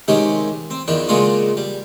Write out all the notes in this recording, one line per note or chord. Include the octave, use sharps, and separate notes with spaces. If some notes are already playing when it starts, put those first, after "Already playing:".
C3 D#3 G#3 C#4 G4
C4
E2 D#3 F3 D4
A#2 C#3 G#3 D4 F4 F#4
G3